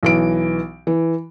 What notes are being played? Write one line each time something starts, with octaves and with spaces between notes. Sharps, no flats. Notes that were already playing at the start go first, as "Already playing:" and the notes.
B1 E3 D7
E3